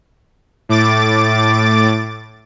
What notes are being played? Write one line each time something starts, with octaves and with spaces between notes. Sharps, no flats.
A2 D6 A6